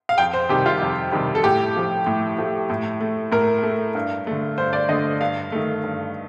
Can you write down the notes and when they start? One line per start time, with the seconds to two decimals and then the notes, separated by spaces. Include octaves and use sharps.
0.09 F5
0.18 F2 G5
0.33 C5
0.49 C3 D#3 G3 G4
0.66 F4
0.81 F2
1.12 C3 D#3 G3
1.35 A4
1.43 A2 G4
1.76 F3 A3
2.06 A2
2.38 F3 A3
2.70 A2
3.01 A3
3.32 A2 A#4
3.63 A3
3.95 G2
4.27 D3 A3
4.58 G2 C5
4.73 D5
4.89 D3 A3 D#5
5.21 G2 F5
5.52 D#3 A3
5.83 G2